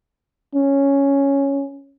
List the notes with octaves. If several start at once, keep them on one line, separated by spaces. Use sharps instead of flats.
C#4